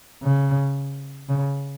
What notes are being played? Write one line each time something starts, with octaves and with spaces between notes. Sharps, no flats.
C#3
C#3